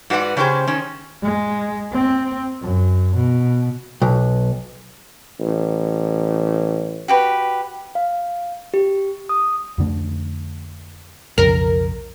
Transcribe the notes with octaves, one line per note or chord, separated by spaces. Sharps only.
G#2 F#4 B4 D5 F#5
C#3 C#4 G4 G#4 C5
D#3 C#4
G#3
C4
F#2
B2
B1
A1
F#4 G4 B4
F5
G4
D#6
F2 D3 A3
B1 F2 C#3 A#4